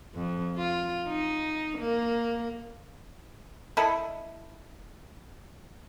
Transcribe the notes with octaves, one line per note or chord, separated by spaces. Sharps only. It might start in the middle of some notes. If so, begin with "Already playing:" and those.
F2
F4
D#4
A#3
E4 A4 D#5 B5